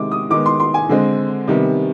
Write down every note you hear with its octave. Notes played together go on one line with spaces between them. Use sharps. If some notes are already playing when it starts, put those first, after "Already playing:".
Already playing: C3 D#3 G#3 D6
D#6
D#3 G#3 B3 D6
C6
C6
G#5
D3 G#3 C4
C3 D#3 G3 B3